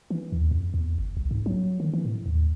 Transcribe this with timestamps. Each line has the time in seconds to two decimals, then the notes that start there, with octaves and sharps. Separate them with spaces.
0.10 E3
0.32 D#2
0.51 F2
0.74 E2
0.98 G1
1.17 C2
1.31 G#2
1.46 F#3
1.80 D#3
1.93 E3
2.05 A2
2.26 D#2